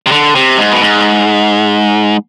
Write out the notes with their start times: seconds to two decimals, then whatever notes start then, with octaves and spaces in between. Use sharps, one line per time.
0.06 C3
0.12 D3
0.35 C3
0.58 G#2
0.72 B2
0.81 G#2